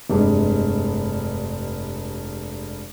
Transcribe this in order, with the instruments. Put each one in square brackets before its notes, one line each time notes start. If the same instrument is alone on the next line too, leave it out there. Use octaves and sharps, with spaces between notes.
[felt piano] F1 G2 G#3